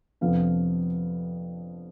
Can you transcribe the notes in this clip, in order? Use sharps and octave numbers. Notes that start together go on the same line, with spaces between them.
F2 C3 F3 B3 D4 F5